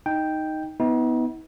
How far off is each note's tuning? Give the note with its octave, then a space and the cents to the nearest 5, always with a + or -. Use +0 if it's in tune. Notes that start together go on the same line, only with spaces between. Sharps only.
D#4 +0 G5 +0
B3 +10 D#4 +45